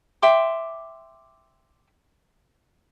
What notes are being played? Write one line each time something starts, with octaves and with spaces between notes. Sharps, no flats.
E5 G5 C6 D6